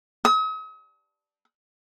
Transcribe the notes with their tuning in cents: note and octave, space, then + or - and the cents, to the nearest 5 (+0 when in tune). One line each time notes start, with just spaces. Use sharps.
D#6 +45